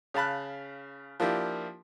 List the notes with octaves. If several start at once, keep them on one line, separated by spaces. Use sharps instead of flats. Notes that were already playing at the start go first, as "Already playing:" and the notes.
C#3 F5 A5 B5 F#6
F3 A#3 D4 E4 G4